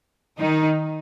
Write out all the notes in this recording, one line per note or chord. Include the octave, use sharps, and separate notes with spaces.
D#3 D#4